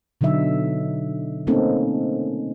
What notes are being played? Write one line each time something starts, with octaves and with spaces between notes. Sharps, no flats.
B2 D3 F#3 D#4 E5
A3 A#3 C4 C#4 D#4 A4